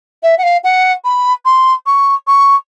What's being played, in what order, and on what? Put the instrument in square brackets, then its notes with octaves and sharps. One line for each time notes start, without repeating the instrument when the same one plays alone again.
[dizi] E5
F#5
F5
F#5
B5
C6
C#6
C#6